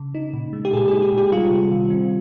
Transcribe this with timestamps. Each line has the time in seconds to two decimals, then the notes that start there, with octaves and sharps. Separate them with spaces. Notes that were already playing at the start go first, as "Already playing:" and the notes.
Already playing: C#3
0.15 D#4
0.34 A#2
0.53 G#3
0.65 G4
0.73 A#2 G#4
0.88 G#4
0.93 D#4
1.02 G4
1.12 A#2
1.18 G4
1.32 G3 F4
1.51 C3
1.71 D#3
1.90 C4